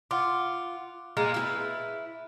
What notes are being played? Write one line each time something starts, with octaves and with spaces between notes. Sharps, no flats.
F4 F#5 D6
A#2 G#3 A#3 F6
E4 G4 B4